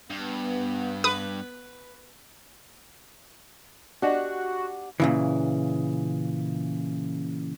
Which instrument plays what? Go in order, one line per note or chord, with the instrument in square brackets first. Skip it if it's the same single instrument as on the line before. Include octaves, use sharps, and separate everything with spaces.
[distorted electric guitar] G2 [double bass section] B3
[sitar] B4 [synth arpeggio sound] D#6
[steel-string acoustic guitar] D4 G4 F#5 [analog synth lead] F#4 [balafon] D5 D#5
[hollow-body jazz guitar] A#2 C#3 E3